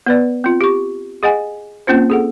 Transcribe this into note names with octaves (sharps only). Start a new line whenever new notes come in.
B3 B4 D5
C4 F4
G4 C#6
G#4 D#5 F#5 G#5
A#3 C4 C#4 F4 C5
G#4 A4 F#5